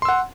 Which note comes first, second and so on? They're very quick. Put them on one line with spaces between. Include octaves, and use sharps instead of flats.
C6 E6 F#5